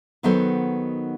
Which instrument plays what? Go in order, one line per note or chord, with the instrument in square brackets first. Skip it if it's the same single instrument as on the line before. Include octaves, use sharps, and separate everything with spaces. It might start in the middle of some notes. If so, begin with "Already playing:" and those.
[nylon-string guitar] D#3 F#3 B3 D#4 A4 C5